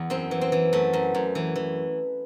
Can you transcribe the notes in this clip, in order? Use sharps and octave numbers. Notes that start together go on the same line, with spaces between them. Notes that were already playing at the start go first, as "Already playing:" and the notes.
Already playing: E2
F#2 C4
E3
C4
E3
F#2 A3
F#2
F#2
E3
E3